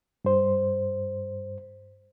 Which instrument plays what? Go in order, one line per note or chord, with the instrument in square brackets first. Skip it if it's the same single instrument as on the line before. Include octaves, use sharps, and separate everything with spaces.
[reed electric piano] G2 C5